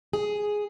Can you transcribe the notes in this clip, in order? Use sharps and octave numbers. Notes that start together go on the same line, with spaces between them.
G#4